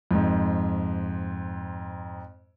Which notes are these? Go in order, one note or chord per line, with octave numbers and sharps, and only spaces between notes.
F2 G#2